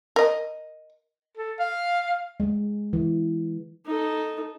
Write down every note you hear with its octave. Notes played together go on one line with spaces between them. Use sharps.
A#4 D#5
A4
F5
G#3
E3
D#4 A4